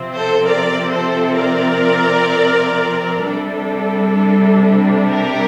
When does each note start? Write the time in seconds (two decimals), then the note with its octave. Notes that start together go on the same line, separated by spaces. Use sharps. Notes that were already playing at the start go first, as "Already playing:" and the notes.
Already playing: C3 F3 C4
0.15 A4 C5
0.46 A#4 D5
0.92 A4 C5
1.38 A#4 D5
3.24 C3 G3 D4 A4
5.10 G4 A#4